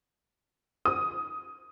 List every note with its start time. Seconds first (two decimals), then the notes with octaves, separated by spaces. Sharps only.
0.85 D#6